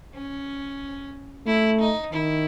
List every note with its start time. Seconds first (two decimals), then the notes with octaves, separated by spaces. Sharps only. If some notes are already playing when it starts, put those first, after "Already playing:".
0.14 C#4
1.46 A3 E4
1.80 D#4
2.13 D#3 E4